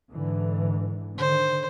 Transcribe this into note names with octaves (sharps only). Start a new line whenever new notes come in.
G#2 D3 E3
D3 D#3 C5